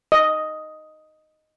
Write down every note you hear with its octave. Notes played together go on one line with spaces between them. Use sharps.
D#5